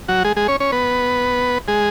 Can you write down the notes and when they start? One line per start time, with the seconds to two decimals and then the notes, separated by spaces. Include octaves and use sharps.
0.08 F#3 F#4
0.25 G#3 G#4
0.37 G#3 G#4
0.48 C#4 C#5
0.60 C#4 C#5
0.72 B3 B4
1.68 G#3 G#4